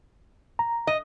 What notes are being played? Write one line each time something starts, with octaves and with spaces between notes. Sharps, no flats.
A#5
D#5